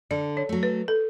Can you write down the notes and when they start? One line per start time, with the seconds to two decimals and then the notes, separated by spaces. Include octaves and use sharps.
0.11 D3 D5
0.37 C#5
0.49 F#3 A3
0.63 B4
0.88 A4